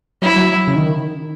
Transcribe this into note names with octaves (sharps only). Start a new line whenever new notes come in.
F#3 E4
F#3
C#3
D#3